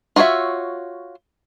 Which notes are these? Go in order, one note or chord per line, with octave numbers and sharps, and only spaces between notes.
F4 F#4 C#5 D5 E5